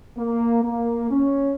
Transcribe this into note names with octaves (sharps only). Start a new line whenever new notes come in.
A#3
A#3
C#4